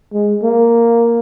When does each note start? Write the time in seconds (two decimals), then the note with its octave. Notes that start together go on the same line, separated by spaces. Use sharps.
0.13 G#3
0.43 A#3